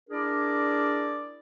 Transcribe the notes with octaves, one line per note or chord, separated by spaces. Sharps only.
D4 E4 G#4 A#4 D5